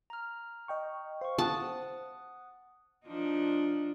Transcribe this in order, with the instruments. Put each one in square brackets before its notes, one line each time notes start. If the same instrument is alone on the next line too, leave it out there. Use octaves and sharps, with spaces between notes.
[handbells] A#5 F6
[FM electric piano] D#5 G5 C#6
[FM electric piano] C5 [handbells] F5 C#6
[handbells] F#5 D#6 F#6 [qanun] A5
[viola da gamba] F3 D4 D#4